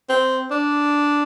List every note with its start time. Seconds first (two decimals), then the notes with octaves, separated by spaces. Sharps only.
0.09 C4
0.51 D4